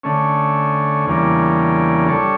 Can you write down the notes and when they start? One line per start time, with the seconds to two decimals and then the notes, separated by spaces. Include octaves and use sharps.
0.03 D3 A3 C#4
1.07 E2 C#3 G3 A#3 D4
2.08 G3 D4 A4 C#5